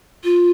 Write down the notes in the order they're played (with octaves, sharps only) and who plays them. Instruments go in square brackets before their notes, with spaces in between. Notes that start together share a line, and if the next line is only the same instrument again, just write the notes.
[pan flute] F4